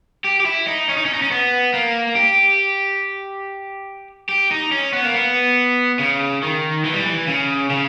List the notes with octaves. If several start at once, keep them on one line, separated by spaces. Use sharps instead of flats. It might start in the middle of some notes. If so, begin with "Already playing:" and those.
G4
G4
E4
D#4
C#4
D#4
C#4
D#4
C#4
B3
A#3
G4
G4
D#4
C#4
B3
A#3
B3
C#3
D#3
E3
G3
E3
C#3
C#3